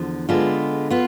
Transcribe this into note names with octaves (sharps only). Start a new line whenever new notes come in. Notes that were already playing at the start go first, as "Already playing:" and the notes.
Already playing: E2 D3 F3
D3 G#3 B3 F4
B3 F4